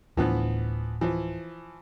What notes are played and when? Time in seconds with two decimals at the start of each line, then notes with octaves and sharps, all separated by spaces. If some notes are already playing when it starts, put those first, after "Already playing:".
0.17 D1 A2 E3 F3 B3 D4
1.01 E3 F3